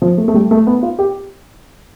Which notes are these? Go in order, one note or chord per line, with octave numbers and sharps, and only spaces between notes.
F3
A3
A3
G3
A3
B3
F4
G4